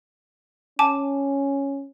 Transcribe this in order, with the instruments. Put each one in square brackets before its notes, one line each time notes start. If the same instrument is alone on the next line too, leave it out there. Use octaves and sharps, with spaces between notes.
[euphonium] C#4 [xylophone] G#5 A5 D6